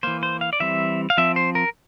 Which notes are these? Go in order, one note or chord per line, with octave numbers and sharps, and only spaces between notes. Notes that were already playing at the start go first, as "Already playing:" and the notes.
E3 A#3 C5
C5
F5
D5
E3 G3 C4 E5
F5
F3 C4 E5
C5
A#4